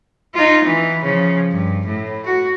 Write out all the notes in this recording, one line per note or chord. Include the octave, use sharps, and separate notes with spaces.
D#4 F4
E3
C#3 F3
G2
A2
F#4